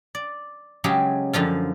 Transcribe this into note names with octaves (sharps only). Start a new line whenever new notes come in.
D5
C#3 F#3 G#3 G4
F#2 D3 F3 F4